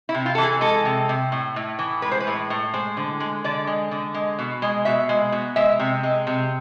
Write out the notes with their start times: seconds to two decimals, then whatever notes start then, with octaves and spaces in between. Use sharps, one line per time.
0.09 E4
0.14 C3
0.26 F4
0.35 E3 A4
0.43 G#4
0.61 G#3 A4
0.85 C3
1.09 C3
1.32 A2
1.56 A2
1.79 E3
2.02 G#3 B4
2.12 C5
2.20 B4
2.27 A2
2.50 A2
2.74 G#3 C5
2.97 D3
3.20 G#3
3.44 D3 D5
3.67 G#3
3.91 D3
4.14 G#3
4.39 B2
4.62 G#3
4.85 B2 E5
5.09 G#3
5.32 B2
5.56 G#3 E5
5.79 C3
6.03 G#3
6.27 C3